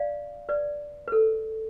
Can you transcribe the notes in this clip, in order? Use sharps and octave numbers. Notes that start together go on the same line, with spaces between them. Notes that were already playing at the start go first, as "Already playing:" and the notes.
Already playing: D5 F5
B4 D5
B4
A4